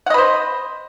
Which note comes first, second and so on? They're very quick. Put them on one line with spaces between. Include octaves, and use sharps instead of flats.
F#5 D#5 B4 C5